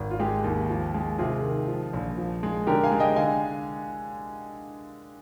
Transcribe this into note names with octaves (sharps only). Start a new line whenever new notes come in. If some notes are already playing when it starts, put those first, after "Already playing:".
Already playing: G#1
F4
G#3 G4
D#2
F3
G#3
C3 F4 G#4
D#3
F3
A#1
F3
G#3
D3 G4 A#4
F5 G#5
G#3
D#5 G5
D3 F5 G#5